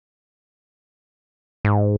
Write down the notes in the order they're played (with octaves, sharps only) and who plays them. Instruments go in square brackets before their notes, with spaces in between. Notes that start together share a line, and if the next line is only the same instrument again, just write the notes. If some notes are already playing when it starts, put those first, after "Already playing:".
[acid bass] G#2